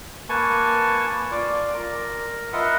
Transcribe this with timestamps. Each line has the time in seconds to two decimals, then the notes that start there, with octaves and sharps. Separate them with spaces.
0.29 A#3 B4 G#5 A5 C#6
1.31 F4 D5
1.74 A#4
2.53 F4 A#4 B4 D#5 E5 F#5